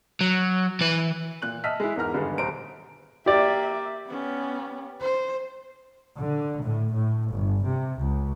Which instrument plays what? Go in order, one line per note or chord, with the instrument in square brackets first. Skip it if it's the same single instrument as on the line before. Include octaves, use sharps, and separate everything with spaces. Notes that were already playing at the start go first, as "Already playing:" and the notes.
[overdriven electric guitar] F#3
E3 B4
[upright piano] A#2 F#6 F#7
D#5 E5 A5 E6 F6 B6
G#3 E4
E2 G#2 A#4 A#5 F6
G2 D3 D#3 G#3 B3
D#1 C5 A#5 D7
[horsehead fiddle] A#3 E5 [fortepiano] G4 D5
[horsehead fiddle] B3 C#4
C5
[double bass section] D3
A2
A2
G1
C3
C#2